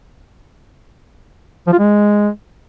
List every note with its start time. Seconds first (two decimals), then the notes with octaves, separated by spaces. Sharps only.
1.67 F3
1.73 F4
1.79 G#3